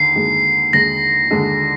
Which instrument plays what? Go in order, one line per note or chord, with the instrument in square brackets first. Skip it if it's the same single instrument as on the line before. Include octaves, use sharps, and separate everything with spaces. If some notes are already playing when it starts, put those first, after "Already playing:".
Already playing: [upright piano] D#2 D3 [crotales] C7
[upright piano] D#2 D3 G#3
[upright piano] D#2 D3 G#3 [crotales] A#6
[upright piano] D#2 D3 G#3